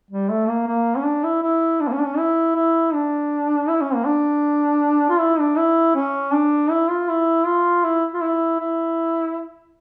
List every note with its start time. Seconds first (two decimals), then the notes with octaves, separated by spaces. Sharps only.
0.11 G3
0.30 A3
0.48 A#3
0.67 A#3
0.97 C#4
1.05 D4
1.24 E4
1.43 E4
1.81 D4
1.88 A#3
1.93 C#4
1.99 D4
2.05 C#4
2.18 E4
2.56 E4
2.93 D4
3.69 E4
3.81 C#4
3.95 A#3
4.06 D4
5.10 F4
5.20 E4
5.39 D4
5.57 E4
5.95 C#4
6.33 D4
6.70 E4
6.90 F4
7.09 E4
7.46 F4
7.84 E4
8.14 F4
8.22 E4
8.59 E4